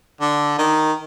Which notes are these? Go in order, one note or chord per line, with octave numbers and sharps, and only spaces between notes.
D3
D#3